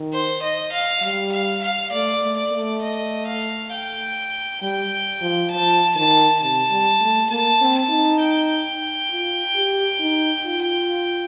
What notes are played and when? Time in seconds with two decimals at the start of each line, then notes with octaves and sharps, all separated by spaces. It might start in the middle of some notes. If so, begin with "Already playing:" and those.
Already playing: D#3
0.13 C5
0.43 D#5
0.73 F5
1.02 G3 F5
1.32 F5
1.63 F5
1.92 A3 D5
2.22 A3
2.37 D5
2.52 A3
2.82 D#5
3.27 F5
3.72 G5
4.62 G3 G5
5.21 F3
5.51 F3 A5
5.96 D#3 A5
6.40 C3 A5
6.70 G3
7.01 A3
7.30 A#3 A5
7.61 C4
7.75 A5
7.90 D#4
8.20 G5
9.11 F4
9.55 G4
10.00 D#4
10.45 F4